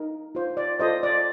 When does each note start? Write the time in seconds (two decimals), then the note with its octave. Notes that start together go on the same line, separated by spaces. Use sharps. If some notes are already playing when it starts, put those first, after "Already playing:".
Already playing: D#4 A#4
0.35 F4 C5
0.57 D5
0.79 F4 A4 C5 D#5
1.03 D5